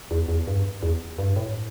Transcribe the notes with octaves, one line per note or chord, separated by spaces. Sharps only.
E2
E2
G2
E2
G2
A2